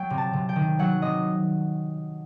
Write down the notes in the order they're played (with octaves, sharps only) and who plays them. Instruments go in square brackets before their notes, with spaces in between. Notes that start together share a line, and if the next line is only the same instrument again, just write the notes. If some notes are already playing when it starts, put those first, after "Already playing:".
Already playing: [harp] F#3 G5
C3
A5
C3
G5
D#3
F#3 F#5
C3 D#5